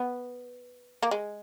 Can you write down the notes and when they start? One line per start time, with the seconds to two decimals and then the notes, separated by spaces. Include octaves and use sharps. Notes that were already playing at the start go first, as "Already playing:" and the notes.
Already playing: B3
1.03 A#3
1.11 G#3